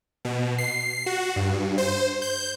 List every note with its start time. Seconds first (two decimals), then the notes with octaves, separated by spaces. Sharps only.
0.25 B2
0.58 C7
1.06 F#4
1.36 G2
1.78 C5
2.22 G6